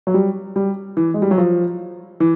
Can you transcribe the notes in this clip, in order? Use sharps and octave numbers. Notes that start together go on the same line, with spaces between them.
F#3
G3
G3
E3
G#3
G3
F#3
F3
E3